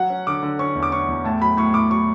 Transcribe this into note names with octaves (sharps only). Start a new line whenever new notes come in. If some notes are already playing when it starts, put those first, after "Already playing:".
Already playing: F#3 F#5
C#4
D3 D6
D3
C#4 C#6
E2
D6
C#4 C#6
E2
A2 A5
F#3 B5
A2 C#6
A2 D6
F#3 C#6